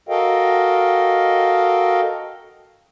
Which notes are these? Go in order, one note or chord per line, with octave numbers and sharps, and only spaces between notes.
F#4 A4 A#4 D#5 F5 G5